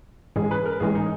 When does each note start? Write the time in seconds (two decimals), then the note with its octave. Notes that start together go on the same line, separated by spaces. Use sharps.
0.36 G#2 E3 G#3 C#4 G#4
0.51 B4
0.66 A#4
0.80 G#2 E3 G#3 C#4 G#4
0.95 D#4